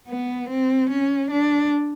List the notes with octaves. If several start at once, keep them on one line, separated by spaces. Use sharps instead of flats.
B3
C4
C#4
D4